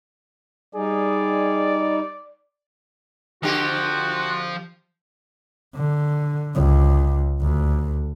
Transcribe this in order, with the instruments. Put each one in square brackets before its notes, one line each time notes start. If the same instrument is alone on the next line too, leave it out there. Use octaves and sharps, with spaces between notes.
[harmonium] G3 D#4 [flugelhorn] G#4 [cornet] D5
[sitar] D3 C4 G4 [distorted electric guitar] F3 [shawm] F#4
[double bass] D3
C#2
D2